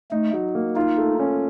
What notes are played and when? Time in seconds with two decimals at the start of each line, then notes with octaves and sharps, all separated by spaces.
0.12 A3 D#4
0.33 F#3
0.55 A#3
0.76 D#4 F4
0.98 A3
1.19 C#4